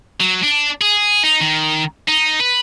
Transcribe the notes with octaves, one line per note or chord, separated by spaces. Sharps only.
F#3
D4
G#4
D#4
D#3
D#4
B4